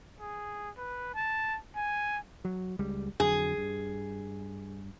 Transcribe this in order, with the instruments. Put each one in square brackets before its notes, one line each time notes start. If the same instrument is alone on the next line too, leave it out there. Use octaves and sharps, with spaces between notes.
[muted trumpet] G#4
B4
A5
G#5
[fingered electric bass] F#3
C#2 G3 G#3
[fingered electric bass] F2 D3 F#3 [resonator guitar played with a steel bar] G#4
[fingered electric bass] G2